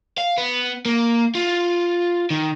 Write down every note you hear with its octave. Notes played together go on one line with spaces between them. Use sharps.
F5
B3
A#3
F4
D#3